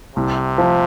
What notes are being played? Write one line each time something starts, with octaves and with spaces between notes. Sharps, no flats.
C2 C3
F3